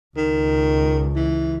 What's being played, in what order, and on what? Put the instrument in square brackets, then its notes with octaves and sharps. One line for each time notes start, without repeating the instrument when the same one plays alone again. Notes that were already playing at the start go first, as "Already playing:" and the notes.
[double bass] C#2 [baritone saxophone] D#3
[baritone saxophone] E3